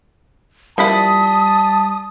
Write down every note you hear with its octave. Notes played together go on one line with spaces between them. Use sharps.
F3 G3 A#3 E4 A5 D#6 B6